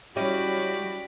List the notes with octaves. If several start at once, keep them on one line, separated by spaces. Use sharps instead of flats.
G3 C#4 E4 F#4 G4 D5 D#5 B5